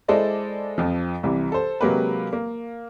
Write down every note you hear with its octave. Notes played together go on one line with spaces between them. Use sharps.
G#3 E4 A4 C5 D5 D#5
F2 F3
C2 C3 E3
A4 C5
C3 F#3 G#3 A#3 G4 B4
A#3